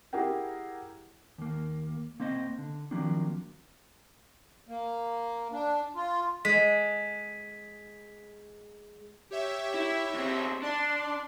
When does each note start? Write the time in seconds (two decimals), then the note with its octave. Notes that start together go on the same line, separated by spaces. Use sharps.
0.13 E4 G4 G#4 A#4 F#5 G5
1.38 D#2 A#3
2.20 A#3 C4 C5 D#5
2.58 D3
2.91 D#3 F3 F#3 A#3 C4 D4
4.68 A#3
5.52 D4
5.95 F4
6.45 G#3 B6
9.31 G4 C#5 E5
9.74 E4
10.14 D#2 C4
10.62 D4 D5 C6